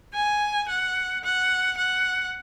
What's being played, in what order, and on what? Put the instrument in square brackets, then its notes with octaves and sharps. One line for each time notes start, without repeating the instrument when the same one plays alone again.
[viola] G#5
F#5
F#5
F#5